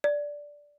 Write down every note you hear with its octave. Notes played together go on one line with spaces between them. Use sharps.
D5